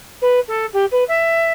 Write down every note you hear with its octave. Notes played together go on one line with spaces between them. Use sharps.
B4
A4
G4
B4
E5